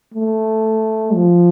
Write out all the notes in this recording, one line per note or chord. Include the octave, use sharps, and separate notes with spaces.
A3
F3